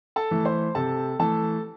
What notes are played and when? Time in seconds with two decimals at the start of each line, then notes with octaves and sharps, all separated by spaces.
0.16 A4 A5
0.31 E3 A3
0.45 C5 C6
0.75 C3 A4 A5
1.19 E3 A3 A4 A5